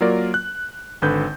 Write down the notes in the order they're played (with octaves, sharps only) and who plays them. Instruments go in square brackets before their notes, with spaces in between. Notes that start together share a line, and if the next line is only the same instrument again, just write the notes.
[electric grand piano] F#3 A#3 F4 A#4 D5
F#6
G#1 D3 B4 G6